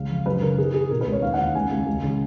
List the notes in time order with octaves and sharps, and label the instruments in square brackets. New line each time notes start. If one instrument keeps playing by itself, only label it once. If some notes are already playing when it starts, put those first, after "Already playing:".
Already playing: [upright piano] C#2 C#3 F5
F2
F#2 B4
C#3 A#4
D#3 G#4
D#3 G#4
B2 A#4
B4
C#2
C#5
D#2 F5
F#5
D#2
C#2 G#5
C#2
C#2
C#3